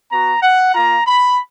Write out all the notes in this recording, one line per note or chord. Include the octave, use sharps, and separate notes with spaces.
B3 F#4 A#5
F#5
A#3 F4 A#5
B5